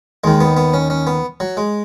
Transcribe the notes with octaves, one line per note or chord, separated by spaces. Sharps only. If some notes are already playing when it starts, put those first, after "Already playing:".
D#2 D#3 G#3
B3
B3
C#4
C#4
B3
F#3
G#3